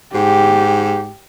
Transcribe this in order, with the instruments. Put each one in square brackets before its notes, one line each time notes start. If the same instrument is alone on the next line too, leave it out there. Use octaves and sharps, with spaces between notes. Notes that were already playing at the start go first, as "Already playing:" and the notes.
[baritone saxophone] G#2 [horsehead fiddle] G4